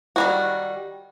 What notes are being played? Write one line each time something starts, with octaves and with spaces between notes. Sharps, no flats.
D#3 G3 F#4